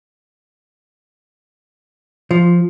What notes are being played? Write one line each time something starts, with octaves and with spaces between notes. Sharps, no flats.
F3